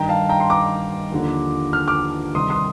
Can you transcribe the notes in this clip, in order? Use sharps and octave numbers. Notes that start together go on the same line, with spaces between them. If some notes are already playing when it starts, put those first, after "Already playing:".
Already playing: G2 D#3 G5 A#5
F5 A5
G5 A#5
C6
A#5 D6
D#2 D3 F3
F6
D6 F6
C2 C3 D#3 C6 D#6
C6 D#6